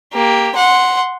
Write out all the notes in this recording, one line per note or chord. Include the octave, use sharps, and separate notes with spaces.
A#3 G4
F#5 C6